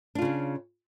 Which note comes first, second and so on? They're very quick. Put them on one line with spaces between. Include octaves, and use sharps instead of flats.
D4 F4 C#3 C#4